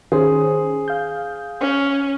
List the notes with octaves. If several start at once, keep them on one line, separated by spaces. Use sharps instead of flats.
D#3 C#4 G#4 C5
F5 G6
C#4